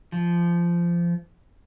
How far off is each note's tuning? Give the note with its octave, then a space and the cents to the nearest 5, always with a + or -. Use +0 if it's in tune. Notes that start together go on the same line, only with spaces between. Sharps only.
F3 -20